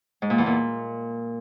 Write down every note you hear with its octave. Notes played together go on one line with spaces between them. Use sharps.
G#2
A#2
E2
A#2